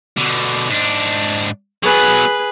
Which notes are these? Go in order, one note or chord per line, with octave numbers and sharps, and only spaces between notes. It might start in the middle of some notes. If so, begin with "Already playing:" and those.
B2 D3
G#2 D4
F#3 B3 G#4 B4